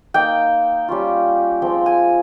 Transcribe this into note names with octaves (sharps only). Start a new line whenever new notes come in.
A#3 D#4 G5
G3 C#4 F4
F3 G#3 C4 G5
G#5